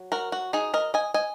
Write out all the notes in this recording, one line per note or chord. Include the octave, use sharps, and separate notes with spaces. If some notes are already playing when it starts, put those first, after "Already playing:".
Already playing: F#3
F#4 A#4
F#4
D#4 G#4
A#4 D#5
D#5 G#5
D#5 G#5